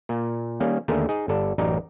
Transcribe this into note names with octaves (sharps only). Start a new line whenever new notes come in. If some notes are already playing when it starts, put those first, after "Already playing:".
A#2
D#3 G3 A#3 C#4
D#2 D3 A3 G#4 A#4
D#4 G#4
G1 A4 D5
A1 F#2 D#4 D5 A#5